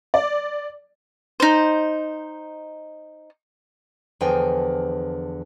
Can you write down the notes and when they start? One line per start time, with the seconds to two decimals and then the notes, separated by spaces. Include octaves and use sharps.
0.14 D5
1.40 D#4 C5
4.21 E2 D3 F3 G5 G#5